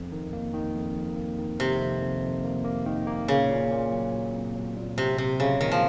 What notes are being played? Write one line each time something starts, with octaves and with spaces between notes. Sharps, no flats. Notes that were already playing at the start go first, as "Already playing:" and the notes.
Already playing: F2
D#3
A#3
D#3
F2
F2
A#3
D#3
F2 C3
F2
F2
F2
A#3
A#3
D#3
A#3
A#2 C#3
A#2
A#2
F#3
F#3
C4
F#3
A#2
C3 C4
C3 C4
C#3 F#3
A#2 D#3
F3